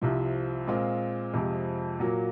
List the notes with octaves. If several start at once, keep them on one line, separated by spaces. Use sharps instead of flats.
C2 C3 F3
A#2 G#3 C4 F4
F2 C3 F3 G#3
A#2 F#3 A#3